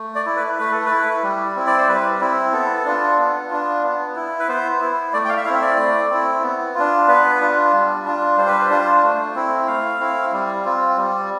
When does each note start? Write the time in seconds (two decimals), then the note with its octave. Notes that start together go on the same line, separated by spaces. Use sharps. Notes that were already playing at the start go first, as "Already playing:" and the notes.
Already playing: A3
0.15 D5
0.26 E4
0.37 B4
0.58 A3 B4
0.72 A4
0.86 B4
0.91 E4
1.23 G3
1.56 C4 E4
1.67 D5
1.78 C5
1.88 G3 B4
2.21 C4 E4
2.53 B3 A4
2.85 D4 F4
3.19 B3
3.50 D4 F4
3.83 B3
4.16 E4
4.40 B4
4.48 B3 C5
4.81 E4
5.13 A3 D5
5.25 G5
5.29 F5
5.37 E5
5.45 C4 E4 F5
5.62 D5
5.77 A3
6.10 C4 E4
6.43 B3
6.75 D4 F4
7.08 B3 B4
7.40 D4 F4
7.73 G3
8.05 D4 F4
8.37 G3 C5
8.48 B4
8.58 C5
8.70 D4 F4
9.03 A3
9.35 C4 E4
9.67 A3 F5
10.00 C4 E4
10.32 G3
10.65 C4 F4
10.97 G3